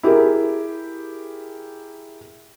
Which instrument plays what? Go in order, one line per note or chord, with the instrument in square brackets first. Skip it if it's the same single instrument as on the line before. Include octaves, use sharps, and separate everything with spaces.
[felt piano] E4 G4 G#4 A#4